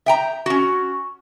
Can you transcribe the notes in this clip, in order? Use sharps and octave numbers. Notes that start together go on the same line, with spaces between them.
E5 G5 A#5
C#4 F#4